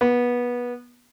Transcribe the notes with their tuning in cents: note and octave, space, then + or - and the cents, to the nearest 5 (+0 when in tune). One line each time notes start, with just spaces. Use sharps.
B3 -20